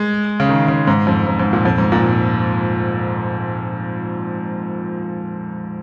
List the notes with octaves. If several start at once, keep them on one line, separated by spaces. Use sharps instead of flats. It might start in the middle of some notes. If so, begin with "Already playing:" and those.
Already playing: G#3
C#3
D#3
C#3
G#2
F2
G#2
G#2
A#2
F2
G#2
A#2